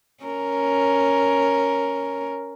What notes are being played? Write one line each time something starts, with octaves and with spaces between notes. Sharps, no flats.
C#4 A#4